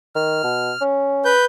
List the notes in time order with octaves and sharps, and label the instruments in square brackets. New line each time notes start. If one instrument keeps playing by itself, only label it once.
[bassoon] D#3 [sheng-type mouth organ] F6
[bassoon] B2
C#4
[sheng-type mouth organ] B4 G6